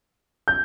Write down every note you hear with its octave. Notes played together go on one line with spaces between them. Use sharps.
G6